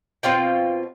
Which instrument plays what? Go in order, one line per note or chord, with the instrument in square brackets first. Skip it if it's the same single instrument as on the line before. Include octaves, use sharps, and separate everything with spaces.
[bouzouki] B2 C4 F4 G5